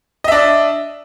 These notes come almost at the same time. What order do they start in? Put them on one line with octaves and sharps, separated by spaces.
D#5 E5 D4